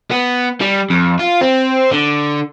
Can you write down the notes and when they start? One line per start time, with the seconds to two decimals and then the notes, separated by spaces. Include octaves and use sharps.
0.12 B3
0.61 G3
0.90 F2
1.19 F4
1.41 C4
1.91 D3